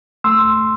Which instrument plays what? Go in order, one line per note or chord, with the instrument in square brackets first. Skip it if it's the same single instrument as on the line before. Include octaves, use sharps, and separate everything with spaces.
[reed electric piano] A3 C6 E6